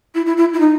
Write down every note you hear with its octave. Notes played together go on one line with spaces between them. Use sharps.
E4
E4
E4
E4
D#4